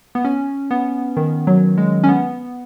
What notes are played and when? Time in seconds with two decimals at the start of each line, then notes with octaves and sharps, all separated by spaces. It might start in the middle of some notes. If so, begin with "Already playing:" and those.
0.15 B3
0.25 C#4
0.71 B3
1.17 D#3
1.47 F#3
1.78 G#3
2.04 C#4
2.08 B3